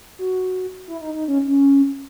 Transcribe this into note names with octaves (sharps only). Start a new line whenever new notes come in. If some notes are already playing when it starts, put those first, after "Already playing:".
F#4
E4
D#4
D#4
C#4
C#4